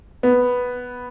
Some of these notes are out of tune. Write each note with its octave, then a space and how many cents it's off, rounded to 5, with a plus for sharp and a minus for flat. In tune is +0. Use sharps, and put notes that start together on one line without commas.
B3 +0